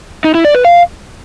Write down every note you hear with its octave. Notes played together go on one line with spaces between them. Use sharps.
D#4
E4
D5
B4
F5